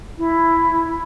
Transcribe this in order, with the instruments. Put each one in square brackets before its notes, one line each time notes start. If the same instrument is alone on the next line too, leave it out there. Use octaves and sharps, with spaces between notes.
[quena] E4